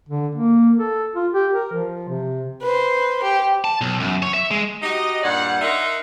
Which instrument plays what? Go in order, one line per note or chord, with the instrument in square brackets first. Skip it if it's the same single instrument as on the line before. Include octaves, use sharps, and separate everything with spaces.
[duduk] D3
A#3
A4
F4
G4
A#4
F3
C3
[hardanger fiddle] B4 C5
G4
[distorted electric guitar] A5
B1
F#2
C#5
E5
G#3
[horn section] D#4 F#4 G4 D#5
G2 A#2 D5 F#5
D#4 A#4 E5 F#5 A#5 C6